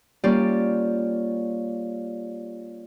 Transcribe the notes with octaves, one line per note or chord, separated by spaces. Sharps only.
G3 A#3 C#4 F4 G4 D5